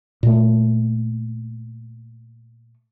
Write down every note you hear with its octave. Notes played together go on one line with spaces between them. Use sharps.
A#2 A3